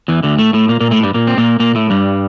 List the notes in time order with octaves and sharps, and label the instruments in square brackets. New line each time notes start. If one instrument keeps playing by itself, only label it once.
[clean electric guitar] E2 E3
D2 D3
A2 A3
A2 A3
A#2 A#3
A#2 A#3
A2 A3
G2 G3
A#2 A#3
C4
A#2 A#3
A#2 A#3
A2 A3
G2 G3